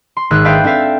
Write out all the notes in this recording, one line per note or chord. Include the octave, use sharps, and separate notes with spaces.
C6
G#1 G#4 E6 F#6
D4 B4 E5 F5 G5 G6
C4 D4 A4 E5 F5